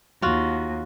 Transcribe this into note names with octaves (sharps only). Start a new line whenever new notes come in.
D#2 F4 F#4